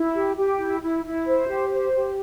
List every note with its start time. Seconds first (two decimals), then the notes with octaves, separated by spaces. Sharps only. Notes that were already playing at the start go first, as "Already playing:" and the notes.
Already playing: E4
0.14 G4
0.37 G4
0.60 E4
0.82 E4
1.05 E4
1.27 C5
1.49 G4
1.71 C5
1.94 G4